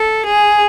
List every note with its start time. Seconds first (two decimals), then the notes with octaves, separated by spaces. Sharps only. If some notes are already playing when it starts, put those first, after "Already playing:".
Already playing: A4
0.26 G#4